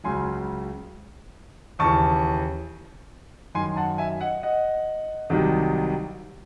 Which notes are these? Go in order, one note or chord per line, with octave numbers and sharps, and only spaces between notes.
C#2 C#3 F#3 G#5 C6
D#2 C#3 E3 A5 C#6
F#2 D#3 F#3 G#5 C6
F#5 A5
E5 G#5
D#5 F#5
D#5 F#5
C2 C3 D#3 F#3